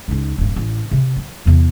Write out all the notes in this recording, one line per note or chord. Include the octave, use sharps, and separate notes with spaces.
C#2 D#4
D#1 G2
A1
C3
F#3
E2 C3